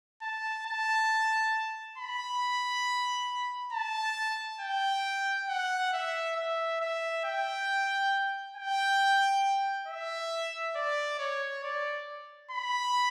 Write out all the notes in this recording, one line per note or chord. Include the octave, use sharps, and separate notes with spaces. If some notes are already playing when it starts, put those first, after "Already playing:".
A5
A5
B5
A5
G5
F#5
E5
E5
E5
G5
G5
E5
D5
C#5
D5
B5